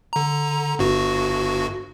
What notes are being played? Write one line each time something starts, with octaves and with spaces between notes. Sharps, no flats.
D3 A#5
G1 G2 F#4